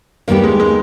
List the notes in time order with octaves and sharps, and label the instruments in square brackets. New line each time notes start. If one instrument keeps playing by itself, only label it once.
[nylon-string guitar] D#2 D#3 G3 B3 G4 [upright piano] A#3
[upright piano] G#3
G#3